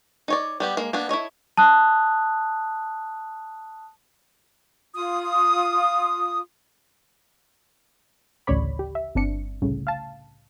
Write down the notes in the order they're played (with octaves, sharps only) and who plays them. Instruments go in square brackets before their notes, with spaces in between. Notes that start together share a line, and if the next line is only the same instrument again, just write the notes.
[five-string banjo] D#4 C#5 D5
G3 B3 G4
G#3 A#3
A#3 B3 D4
E4 A4 C#5 D#5
[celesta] A5 D#6 F#6
[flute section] F4 D#6
[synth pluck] A1 D2 C#3 C#5 D5 B5
G4
E5
G1 C4 D4 C#7
C2 A2 C#3
F5 A5